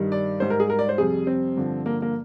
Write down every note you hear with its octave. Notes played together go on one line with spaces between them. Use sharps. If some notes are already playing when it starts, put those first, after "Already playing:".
Already playing: G2 D#3 G3
D5
G#2 G3 C5
A#4
G#4
A#4
D5
C5
F2 C3 G3 G#4
C4
G2 D3 F3
A#3
A#3